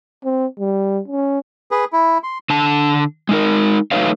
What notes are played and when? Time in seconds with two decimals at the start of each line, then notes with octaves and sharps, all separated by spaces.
0.25 C4
0.59 G3
1.08 C#4
1.71 G#4 B4
1.93 E4
2.23 C6
2.50 D3 A5
3.29 G#3 D#4 A#4
3.91 F#3 A3 D#4 B4 C#5 F5